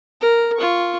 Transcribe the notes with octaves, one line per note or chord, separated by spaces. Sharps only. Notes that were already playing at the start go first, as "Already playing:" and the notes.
A#4
F4 C#6